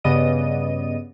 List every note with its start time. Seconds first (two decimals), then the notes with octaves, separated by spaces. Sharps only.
0.04 G2 C#3 B3 D5 D#5 D#7